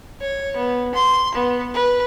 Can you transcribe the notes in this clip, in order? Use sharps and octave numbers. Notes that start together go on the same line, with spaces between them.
C#5
B3
C6
B3
B4